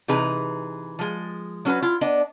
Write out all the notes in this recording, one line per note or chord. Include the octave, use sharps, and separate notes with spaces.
C3 E3 D#4 G#4 B4 A#5
F3 G#3
F#3 C#4 F#4 G#4 B4
E4 F4
B3 D4 D#5